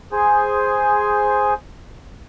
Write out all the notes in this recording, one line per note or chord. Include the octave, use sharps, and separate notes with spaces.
G#4 C5 G#5